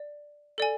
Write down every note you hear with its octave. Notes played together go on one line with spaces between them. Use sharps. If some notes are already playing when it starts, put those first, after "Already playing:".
Already playing: D5
A4 D5 G#5